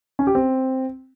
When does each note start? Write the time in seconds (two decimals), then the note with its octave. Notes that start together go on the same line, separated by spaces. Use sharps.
0.19 C#4
0.27 G4
0.35 C4